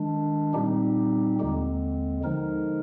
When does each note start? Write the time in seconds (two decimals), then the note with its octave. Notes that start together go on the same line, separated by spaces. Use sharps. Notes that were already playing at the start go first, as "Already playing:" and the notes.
Already playing: D#3 G#3 D4
0.53 A#2 G3 C4 D#4 G4
1.39 D#2 D3 G#3 C4
2.24 D3 F3 G#3 D#4 A#4